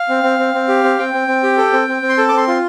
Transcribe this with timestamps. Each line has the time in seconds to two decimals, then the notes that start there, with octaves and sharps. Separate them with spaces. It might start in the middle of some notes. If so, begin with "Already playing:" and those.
Already playing: F5
0.09 C4
0.23 C4
0.39 C4
0.54 C4
0.68 G4
0.84 C4
0.99 C4 G5
1.14 C4
1.28 C4
1.43 G4
1.57 A4
1.73 C4
1.88 C4
2.02 C4
2.09 C6
2.18 A4 A5
2.29 D6
2.33 C4 C6
2.48 F4